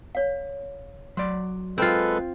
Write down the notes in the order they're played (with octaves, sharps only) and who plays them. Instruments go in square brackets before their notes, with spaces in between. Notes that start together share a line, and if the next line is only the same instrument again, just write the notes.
[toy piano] C#5 F5
[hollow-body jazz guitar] F#3 D5 [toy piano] C6
[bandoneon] G#3 A4 B4 [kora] C4 F4